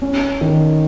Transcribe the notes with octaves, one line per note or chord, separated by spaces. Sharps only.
C#4
D#3